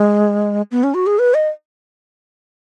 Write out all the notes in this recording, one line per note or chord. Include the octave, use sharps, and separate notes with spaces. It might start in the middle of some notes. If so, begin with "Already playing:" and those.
Already playing: G#3
B3
C#4
F#4
G#4
B4
D#5